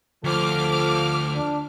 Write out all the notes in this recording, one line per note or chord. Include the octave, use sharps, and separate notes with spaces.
D2 F3 A4 D6 F6
D4